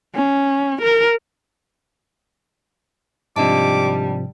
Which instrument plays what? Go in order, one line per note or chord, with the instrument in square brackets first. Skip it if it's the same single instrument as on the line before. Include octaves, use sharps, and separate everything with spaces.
[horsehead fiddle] C#4
A#4
[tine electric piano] G#2 C3 F3 [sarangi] G3 [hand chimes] D4 D#5 A5 [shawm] D6